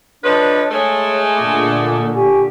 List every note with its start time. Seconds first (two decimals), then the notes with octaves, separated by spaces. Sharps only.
0.24 D3 F3 D4 B4 C#5 D#5
0.71 G#3 A3 C#5
1.36 A#2 D3 D6
2.15 G4 G#5 C#6